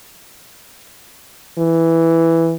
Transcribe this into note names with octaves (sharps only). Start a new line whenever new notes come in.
E3